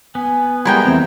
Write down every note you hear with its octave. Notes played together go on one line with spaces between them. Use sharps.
B3 G#5
G3 G#3 E4 A#4 F#5 G5
E2 C4 E5